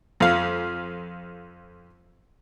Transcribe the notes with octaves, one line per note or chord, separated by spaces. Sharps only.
F2 F5